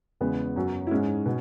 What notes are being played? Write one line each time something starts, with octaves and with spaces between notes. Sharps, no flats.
E2 C#3 G#3 B3
F#2 F#3
E4
G#2 G#3 C#4
B2